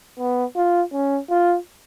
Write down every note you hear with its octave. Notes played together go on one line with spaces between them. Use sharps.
B3
F4
C#4
F4